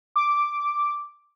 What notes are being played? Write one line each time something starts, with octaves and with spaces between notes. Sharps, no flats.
D6